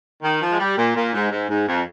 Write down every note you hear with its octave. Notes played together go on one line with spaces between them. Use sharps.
D#3
F3
G#3
G3
A#2
A#2
G#2
G#2
G#2
F2